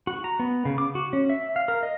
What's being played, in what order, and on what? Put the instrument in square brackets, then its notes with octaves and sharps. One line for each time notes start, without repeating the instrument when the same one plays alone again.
[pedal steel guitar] F#4
A#5
B3
C#3
D6
F#4
C#4
E5
F5
A#4
D#5